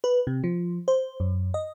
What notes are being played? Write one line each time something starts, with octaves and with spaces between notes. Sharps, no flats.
B4
C3
F3
C5
F#2
D#5